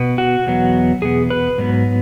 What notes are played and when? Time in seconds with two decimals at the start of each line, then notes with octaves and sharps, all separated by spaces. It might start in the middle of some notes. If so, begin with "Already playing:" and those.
Already playing: B2 B3
0.18 F#4
0.47 E2 B2 F#3 B3
1.02 E2 B2 B3 G#4
1.30 B4
1.58 G#2 F#3 B3